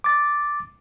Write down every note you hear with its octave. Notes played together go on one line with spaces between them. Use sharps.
D6 A6